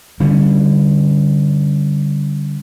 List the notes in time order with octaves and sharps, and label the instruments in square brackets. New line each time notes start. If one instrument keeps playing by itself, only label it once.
[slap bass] D3 G3 C#4